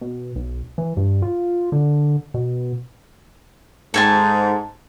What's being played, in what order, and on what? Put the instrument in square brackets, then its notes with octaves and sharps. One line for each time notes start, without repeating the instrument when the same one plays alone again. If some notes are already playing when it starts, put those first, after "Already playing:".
[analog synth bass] B2
B1
E3
G2
F4
D3
B2
[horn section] G#2 [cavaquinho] A4 G#5 A5